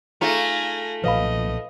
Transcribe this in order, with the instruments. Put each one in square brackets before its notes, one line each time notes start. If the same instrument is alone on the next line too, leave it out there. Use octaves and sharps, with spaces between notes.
[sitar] A3 F4 [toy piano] D#4 G#4 A#5 [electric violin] G#5 A#6
[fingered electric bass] B1 A#2 F3 [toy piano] B4 F5 B5 [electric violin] D#5